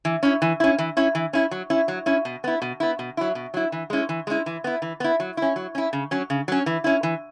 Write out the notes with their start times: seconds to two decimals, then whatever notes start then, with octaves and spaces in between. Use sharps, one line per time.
0.05 E3
0.23 C#4 E4
0.42 E3
0.60 C#4 E4
0.79 E3
0.97 C#4 E4
1.15 E3
1.33 C#4 E4
1.51 F#3
1.70 C#4 E4
1.88 F#3
2.06 C#4 E4
2.25 B2
2.44 B3 E4
2.62 B2
2.80 B3 E4
2.99 B2
3.17 F#3 E4
3.35 B2
3.54 F#3 E4
3.72 E3
3.90 G#3 C#4 E4
4.09 E3
4.27 G#3 C#4 E4
4.46 E3
4.64 B3 E4
4.82 E3
5.00 B3 E4
5.20 F#3
5.37 C#4 E4
5.56 F#3
5.75 C#4 E4
5.93 C#3
6.11 F#3 C#4
6.30 C#3
6.48 F#3 C#4
6.66 E3
6.84 C#4 E4
7.03 E3